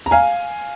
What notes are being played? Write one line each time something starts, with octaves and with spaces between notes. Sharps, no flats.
A#5
F5 G#5